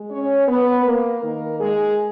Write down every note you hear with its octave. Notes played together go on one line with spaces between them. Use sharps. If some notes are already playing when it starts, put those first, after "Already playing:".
Already playing: G#3
C#4 C#5
B3 B4
A#3 A#4
D#3 A#3 D#4
G#3 G#4